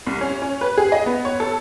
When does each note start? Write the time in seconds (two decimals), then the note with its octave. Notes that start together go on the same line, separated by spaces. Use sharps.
0.07 C2
0.21 C#4
0.42 C#4
0.61 B4
0.78 G#4
0.92 D#5
1.06 B3
1.25 C#5
1.40 A4